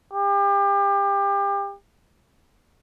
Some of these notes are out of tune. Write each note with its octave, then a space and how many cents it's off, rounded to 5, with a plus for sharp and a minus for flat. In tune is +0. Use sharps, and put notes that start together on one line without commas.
G4 +30